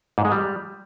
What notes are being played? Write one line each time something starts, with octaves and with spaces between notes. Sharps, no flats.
G#2
G#3
G3